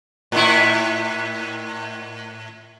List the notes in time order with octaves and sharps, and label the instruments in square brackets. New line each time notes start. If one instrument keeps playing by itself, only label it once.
[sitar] A2 E4